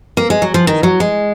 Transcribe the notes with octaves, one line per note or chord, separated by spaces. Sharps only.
A#3
G#3
F#3
F3
D#3
F#3
G#3